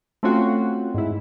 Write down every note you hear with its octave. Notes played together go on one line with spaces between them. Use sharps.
A3 C4 C#4 F4 F#4
G#2 E4